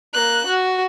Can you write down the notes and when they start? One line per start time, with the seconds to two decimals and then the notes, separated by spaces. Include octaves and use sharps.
0.13 A#3 F#6
0.47 F#4